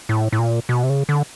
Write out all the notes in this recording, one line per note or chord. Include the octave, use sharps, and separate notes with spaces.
A2
A2
A#2
B2
C3
C#3
D3